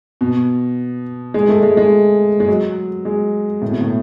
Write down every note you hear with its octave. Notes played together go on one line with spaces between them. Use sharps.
B2
G#3
A3
G#3
G#3
G#3
F#3
G#3
A2
B2
A2